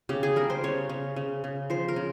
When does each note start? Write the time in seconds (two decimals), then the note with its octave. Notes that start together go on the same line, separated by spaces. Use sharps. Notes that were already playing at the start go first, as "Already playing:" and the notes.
0.09 C#3 G4
0.23 G#4
0.36 G3 A#4
0.50 C5
0.64 C#3 C#5
0.89 C#3
1.16 C#3
1.44 C#3
1.70 F3 C5
1.88 A#4
1.96 C#3